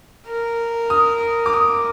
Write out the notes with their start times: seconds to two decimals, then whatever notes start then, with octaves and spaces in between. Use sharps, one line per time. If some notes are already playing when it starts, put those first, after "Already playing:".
0.27 A#4
0.90 D#6
1.46 D6
1.53 D#6